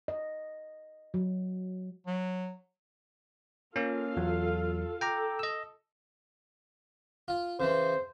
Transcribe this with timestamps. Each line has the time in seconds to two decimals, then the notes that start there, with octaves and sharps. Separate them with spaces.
0.08 D#5
1.14 F#3
2.07 F#3
3.76 A#3 C#4 F4 A4 F5
4.17 E2 F#3
5.01 A4 G5 A#5 D6
5.39 D#5 E6
7.28 F4
7.60 C#3 E3 C5